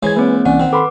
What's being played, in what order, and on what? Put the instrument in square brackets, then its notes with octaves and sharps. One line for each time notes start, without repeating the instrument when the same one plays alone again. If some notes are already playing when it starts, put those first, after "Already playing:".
[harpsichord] E3 G#3 C5 [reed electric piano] C#5 G#6
[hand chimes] A#3 C4 C#5 [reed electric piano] B4
[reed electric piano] C2 E3 D5 [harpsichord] C#4 [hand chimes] F#5
[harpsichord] D#3 C4
[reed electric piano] A4 B5 C6 [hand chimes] B4 D6